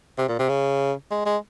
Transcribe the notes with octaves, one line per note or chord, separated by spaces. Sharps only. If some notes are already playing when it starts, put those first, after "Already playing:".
C3
A#2
C3
C#3
G#3
G#3